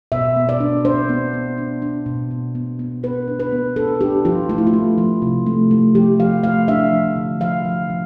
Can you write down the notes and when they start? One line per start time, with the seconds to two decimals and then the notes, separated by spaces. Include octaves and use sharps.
0.12 B2 E5
0.36 B3
0.49 D5
0.60 D4
0.85 D4 C5
1.09 B3
1.33 B3
1.58 D4
1.82 D4
2.06 B2
2.31 B3
2.55 B3
2.79 B3
3.03 B3 B4
3.28 D4
3.40 B4
3.52 B3
3.76 D4 A4
4.01 D4 G4
4.25 F3 F4
4.49 A3 F4
4.58 E4
4.67 F4
4.73 A3
4.98 F3
5.22 C3
5.46 A3
5.71 A3
5.95 F3 G4
6.20 F3 F5
6.43 A3 F5
6.68 D4 E5
6.92 F3
7.16 D3
7.40 F3 F5
7.65 F3
7.90 F3